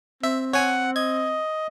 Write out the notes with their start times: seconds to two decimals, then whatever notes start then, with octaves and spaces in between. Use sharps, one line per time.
0.24 C4 E5
0.53 C#5 F#5 G#5
0.96 D#5 G#6